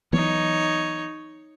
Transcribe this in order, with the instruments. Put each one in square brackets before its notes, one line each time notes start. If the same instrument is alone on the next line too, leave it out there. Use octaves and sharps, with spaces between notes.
[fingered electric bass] E3 F#3 B3 [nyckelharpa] D#4 C#5